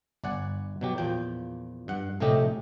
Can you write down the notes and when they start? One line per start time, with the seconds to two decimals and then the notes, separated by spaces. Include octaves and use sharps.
0.24 G1 D5 F#5 G#5
0.81 B2 F#3 G4
0.98 E2 A#2 F3 G5
1.88 G2 F#5
2.20 A#1 A2 C3 A3 G4 D#5